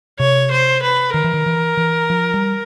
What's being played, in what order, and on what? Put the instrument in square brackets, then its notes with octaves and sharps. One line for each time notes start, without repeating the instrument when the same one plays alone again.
[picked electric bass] C3 [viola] C#5
[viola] C5
B4
[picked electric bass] D#3 [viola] A#4
[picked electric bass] E3
D#3
E3
E3
F3
G3